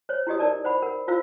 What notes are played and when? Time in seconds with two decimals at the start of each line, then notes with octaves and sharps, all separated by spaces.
0.09 C5 C#5
0.27 E4 F#4 G4 D#5 D#6
0.39 D#4 A#4 D5 A5
0.65 C5 F#5 B5
0.82 A#4 F#5
1.08 E4 F4 C5 F5 E6